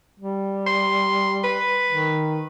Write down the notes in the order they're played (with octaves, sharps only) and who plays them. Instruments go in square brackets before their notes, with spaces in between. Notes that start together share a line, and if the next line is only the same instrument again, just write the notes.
[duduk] G3
[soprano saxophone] C6
B4
[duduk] D#3